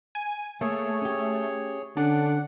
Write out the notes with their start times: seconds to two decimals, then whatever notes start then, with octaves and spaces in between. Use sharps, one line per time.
0.15 G#5
0.61 A3 A#3 G#4 C#5
1.02 C#4 G4
1.97 D3 C#4 D4 F#5